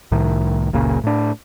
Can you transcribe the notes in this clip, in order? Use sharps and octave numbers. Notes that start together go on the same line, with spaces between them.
C2 A2 D#3
F#1 C#2 A#2 C#3
A2 D4